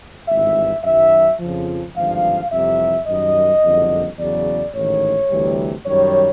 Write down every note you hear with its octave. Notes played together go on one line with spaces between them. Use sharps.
G#1 G2 E3 E5
F#2 D#3 F#3 E5
F2 C#3 F3
G#1 G2 D3 F3 F5
F2 C3 E3 G3 E5
F#2 D#3 G3 D#5
F#1 F2 D3 G3
E2 C#3 F#3 D5
A1 G#2 D#3 C#5
D2 C3 E3 G3
F#2 D#3 G3 C#5